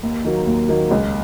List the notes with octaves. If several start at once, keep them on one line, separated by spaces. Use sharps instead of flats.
D#2
D#3 F#3 A#3
D#2
D#3 F#3 A#3
C#2